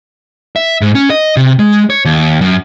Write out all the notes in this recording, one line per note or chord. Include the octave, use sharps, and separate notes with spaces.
E5
G#2
C#4
D#5
C3
G#3
C#5
D#2
F#2